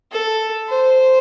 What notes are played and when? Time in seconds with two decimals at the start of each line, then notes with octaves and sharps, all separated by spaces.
0.12 A4
0.68 C5